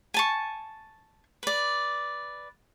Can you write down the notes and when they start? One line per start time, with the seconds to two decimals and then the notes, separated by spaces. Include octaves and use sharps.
0.14 G#5 A5 C#6
1.43 B4 D5